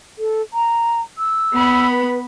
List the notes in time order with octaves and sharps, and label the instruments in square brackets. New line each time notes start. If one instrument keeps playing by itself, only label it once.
[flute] A4
A#5
E6
[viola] B3 B5
[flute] B4